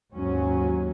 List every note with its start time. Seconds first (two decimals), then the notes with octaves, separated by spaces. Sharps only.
0.13 D#2 G#2 F#3 C#4